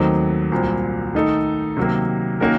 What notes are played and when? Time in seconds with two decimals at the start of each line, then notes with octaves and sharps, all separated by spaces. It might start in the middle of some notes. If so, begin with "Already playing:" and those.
Already playing: D#2 D#3 F#3 A3 C4
0.52 C2 A#2 F#3 C4
1.15 D#3 A3 D#4 A4
1.77 C3 D#3 F#3 A#3
2.40 D#3 A#3 C#4 F#4 A#4